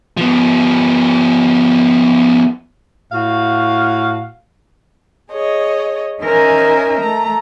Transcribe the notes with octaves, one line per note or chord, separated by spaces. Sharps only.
F3 B3
A2 F#4 F5
G#4 C#5 D#5
C#4 D#4 A#4 C5 E5 G#5
A3 A#5